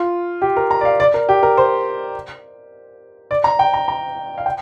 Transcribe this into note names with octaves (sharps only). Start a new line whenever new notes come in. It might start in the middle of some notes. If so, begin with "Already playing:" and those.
Already playing: F4
G4
A#4
A#5
D5
F5
D5
A#4
G4
A#4
C5
D5
A#5
G5
A#5
A#5
F5
G5